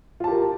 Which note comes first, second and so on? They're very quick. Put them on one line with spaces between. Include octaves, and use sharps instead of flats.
F4 A5 G4 A#4